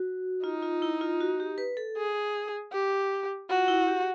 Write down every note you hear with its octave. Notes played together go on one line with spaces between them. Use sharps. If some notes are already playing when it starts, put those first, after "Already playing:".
Already playing: F#4
D#4 F4
F4
E4
F4
F#4
G4
B4
A4
G#4
G4
F4 F#4
E4
G4